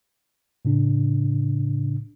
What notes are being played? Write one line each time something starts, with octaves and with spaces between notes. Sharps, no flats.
A2 C#3 D4